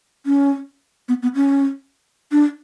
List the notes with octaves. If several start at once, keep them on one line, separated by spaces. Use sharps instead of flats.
C#4
B3
B3
C#4
D4